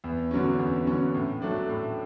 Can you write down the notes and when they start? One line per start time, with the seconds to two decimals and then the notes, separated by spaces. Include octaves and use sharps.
0.04 E2
0.31 D3 F#3 C#4
0.59 E2
0.87 D3 F#3 C#4
1.14 A2
1.42 F#3 A3 D4
1.69 A2